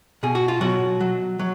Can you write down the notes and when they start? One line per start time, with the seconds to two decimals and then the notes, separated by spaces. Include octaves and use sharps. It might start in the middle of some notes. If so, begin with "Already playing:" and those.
0.23 B2 G#4
0.35 F#4
0.48 F4
0.61 B2 F#3 F#4
1.01 F#3
1.39 F#3